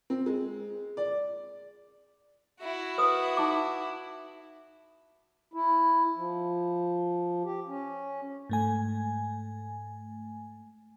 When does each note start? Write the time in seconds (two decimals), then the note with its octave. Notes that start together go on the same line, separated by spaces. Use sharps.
0.10 C4
0.26 G#3
0.97 D5
2.60 E4 F#4
2.98 B4 D#6
3.37 D#4 D6
5.53 E4
6.16 F3
7.44 G4
7.67 C#4
8.50 G#2 A3 G#5